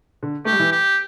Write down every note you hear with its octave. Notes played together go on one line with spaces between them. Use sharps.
D3
A3 G4
G3
E3
G4